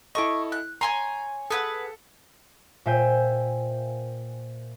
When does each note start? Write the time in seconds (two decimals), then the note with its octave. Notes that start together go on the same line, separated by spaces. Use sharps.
0.15 E4 A4 D#5 C#6 D6
0.52 F#6
0.81 C#5 G#5 A#5 C6
1.50 G#4 A4 B4 F#5
2.86 A#2 C5 E5 G5 G#5 G6